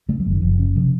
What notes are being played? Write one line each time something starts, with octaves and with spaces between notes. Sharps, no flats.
C#3 A3
F#3
F#1
D#3
F#1 F3
C#3
C3 F3